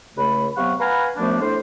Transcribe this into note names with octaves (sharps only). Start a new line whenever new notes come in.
C#2 C#3 A3 C#5 B5
C3 F#3 B3 F5 F#5 C#6
B4 F5 F#5 G#5 A#5 B5
F#2 F3 A3 B3 D4
A2 A3 D4 C5